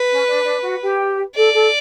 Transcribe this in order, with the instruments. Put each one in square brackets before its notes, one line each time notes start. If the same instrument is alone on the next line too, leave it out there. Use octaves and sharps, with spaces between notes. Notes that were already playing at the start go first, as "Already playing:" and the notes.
Already playing: [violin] B4
[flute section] C#4
D4
D4
F#4
G4
[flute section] A4 [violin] D5
[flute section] A4